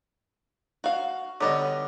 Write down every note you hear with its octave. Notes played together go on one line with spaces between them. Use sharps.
F#4 F5
D3 F#3 G3 B3 D#5